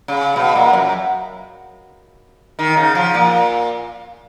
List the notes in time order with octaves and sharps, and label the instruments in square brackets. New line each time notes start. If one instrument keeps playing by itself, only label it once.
[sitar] C#3
B2
A#2
F#2
D#3
C#3
F3
A#2